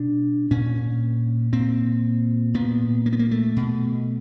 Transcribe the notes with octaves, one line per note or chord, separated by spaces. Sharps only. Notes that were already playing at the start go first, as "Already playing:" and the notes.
Already playing: B2 D4
A#2 C#4
A#2 C4
A#2 B3
A#3
B3
A#3
A3
B2